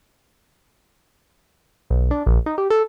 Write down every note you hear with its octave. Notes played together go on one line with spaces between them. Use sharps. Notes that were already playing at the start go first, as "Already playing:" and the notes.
B1
D4
A#1
D#4
G4
A4